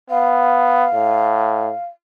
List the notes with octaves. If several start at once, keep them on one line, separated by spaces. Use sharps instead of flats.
B3 F5
A2